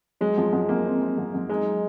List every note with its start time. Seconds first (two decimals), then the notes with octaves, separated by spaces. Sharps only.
0.21 F#3 G#3
0.38 F#2 F3
0.53 F#2 G#3
0.69 F#2 A#3
0.85 C4
1.01 C4
1.18 F#2
1.34 F#2
1.50 G#3 D#4